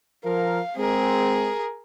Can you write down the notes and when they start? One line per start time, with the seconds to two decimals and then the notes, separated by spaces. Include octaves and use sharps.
0.25 F3 A#4 F5
0.77 G#3 C4 G#4 A#4